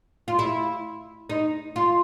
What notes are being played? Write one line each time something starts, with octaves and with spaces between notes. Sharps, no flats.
F4
E4
D#4
F4